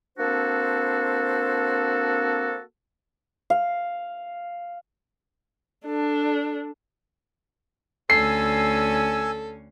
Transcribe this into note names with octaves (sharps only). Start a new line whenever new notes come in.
A#3 C4 D4 F#4 A4 C5
F5
D4 A4
D2 C#4 A4 G#5 E6 C7